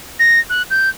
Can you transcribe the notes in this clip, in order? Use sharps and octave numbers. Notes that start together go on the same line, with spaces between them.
A#6
F#6
G6